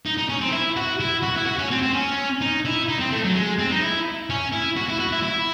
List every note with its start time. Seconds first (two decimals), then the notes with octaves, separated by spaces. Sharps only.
0.05 D#4
0.18 D#4
0.29 C#4
0.41 C4
0.52 E4
0.77 F#4
1.00 E4
1.23 F#4
1.37 E4
1.46 F#4
1.58 C#4
1.71 C4
1.82 C4
1.94 C#4
2.41 D#4
2.65 E4
2.88 D#4
3.00 C4
3.11 A3
3.24 F#3
3.35 G#3
3.59 C4
3.72 D#4
3.82 E4
4.30 C#4
4.52 E4
4.76 F#4
4.88 E4
5.00 F#4
5.12 E4
5.23 E4